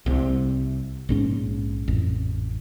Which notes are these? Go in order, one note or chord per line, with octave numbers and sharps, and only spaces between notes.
C2 C3
A#1 G#2 C#4
A1 F2